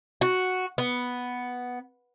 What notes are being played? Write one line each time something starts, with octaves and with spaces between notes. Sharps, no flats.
F#4
B3